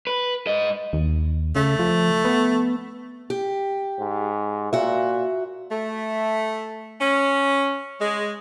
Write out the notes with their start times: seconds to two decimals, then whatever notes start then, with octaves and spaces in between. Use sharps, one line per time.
0.07 B4
0.47 G#2 D#5
0.93 D#2
1.56 C#3 A3
1.79 F3
2.25 B3
3.30 G4
3.99 G#2
4.73 A#2 F#4 E5
5.71 A3
7.00 C#4
8.01 G#3